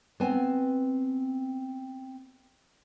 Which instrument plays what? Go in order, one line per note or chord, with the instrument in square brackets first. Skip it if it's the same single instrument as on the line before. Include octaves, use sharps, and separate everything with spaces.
[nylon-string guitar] B3 C4 G#5